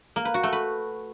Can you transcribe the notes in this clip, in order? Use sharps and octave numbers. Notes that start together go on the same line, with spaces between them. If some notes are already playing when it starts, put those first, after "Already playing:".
A#3
B4
F#4
A3
B4